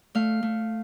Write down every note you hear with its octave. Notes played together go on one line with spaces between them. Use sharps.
A3 F5
A3